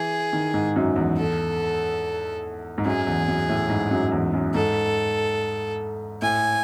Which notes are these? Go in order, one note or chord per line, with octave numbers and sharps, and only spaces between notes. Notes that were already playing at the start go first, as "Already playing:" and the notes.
Already playing: E3 G#4
D#3
G#2
F#2
E2
A4
G#2
F#2 G#4
E2
F#2
A2
G#2
F#2
E2
F#2
G#2 A4
A2 G#5